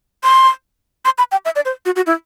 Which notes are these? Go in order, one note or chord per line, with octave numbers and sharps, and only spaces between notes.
C6
C6
B5
G5
E5
D5
C5
F#4
F#4
E4